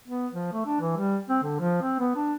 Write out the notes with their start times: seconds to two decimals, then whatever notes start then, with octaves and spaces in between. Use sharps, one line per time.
0.08 B3
0.33 F3
0.53 A3
0.66 D4
0.81 E3
0.97 G3
1.29 C4
1.43 D3
1.60 F3
1.82 C4
1.99 B3
2.16 D4